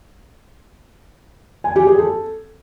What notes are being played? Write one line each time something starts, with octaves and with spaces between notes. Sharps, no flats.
G#5
G4
G#4
A4